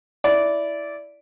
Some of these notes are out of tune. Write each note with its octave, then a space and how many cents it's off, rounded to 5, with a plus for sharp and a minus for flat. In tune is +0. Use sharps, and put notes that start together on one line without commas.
E4 +0 D5 -10